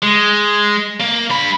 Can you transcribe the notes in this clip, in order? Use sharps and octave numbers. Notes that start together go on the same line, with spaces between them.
G#3
A#3
G2 B5